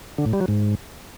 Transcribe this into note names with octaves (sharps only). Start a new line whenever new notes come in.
D3
A2
G3
F#3
G#2